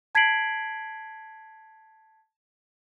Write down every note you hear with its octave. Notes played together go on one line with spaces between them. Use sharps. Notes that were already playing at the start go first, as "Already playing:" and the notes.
A5 G#6 B6 C7 D7 F#7